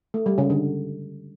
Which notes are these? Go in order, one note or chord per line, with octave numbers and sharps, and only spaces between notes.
A3
G3
C#3
D3